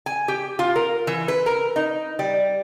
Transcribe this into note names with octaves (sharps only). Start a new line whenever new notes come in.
G#5
G4
F4
A#4
E3
B4
A#4
D#4
G3